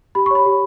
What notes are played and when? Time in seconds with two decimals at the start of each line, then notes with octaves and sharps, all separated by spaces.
0.15 G4 B5
0.26 C#6
0.31 C#5 B5
0.46 G4